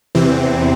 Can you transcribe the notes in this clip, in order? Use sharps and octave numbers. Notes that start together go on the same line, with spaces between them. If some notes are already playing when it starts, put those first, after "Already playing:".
E2 C3 E3 C4